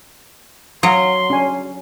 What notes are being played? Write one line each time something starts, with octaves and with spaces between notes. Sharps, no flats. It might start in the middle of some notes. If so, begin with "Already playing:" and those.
F#3 F5 C6 D#6
C#4 D4 G#5